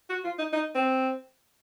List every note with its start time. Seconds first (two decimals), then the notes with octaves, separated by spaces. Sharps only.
0.10 F#4
0.24 F4
0.39 D#4
0.53 D#4
0.75 C4